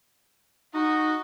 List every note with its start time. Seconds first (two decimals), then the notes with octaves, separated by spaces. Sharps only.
0.74 D#4 F#4